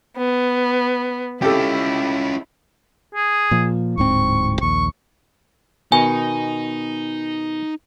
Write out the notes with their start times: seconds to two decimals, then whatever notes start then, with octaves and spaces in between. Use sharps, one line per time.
0.17 B3
1.42 C#4 E4 F4 G4 A4
3.15 G#4
3.51 A#2 F3
3.98 D1 G#2 C4 C#6
4.61 A#1 D#2 C#6
5.92 B2 D#3 D#4 G#5